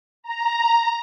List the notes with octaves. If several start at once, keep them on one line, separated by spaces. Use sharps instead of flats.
A#5